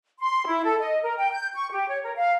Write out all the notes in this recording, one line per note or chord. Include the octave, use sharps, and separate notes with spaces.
C6
E4
A4
D#5
A#4
G5
G6
C#6
G4
C#5
A#4
F5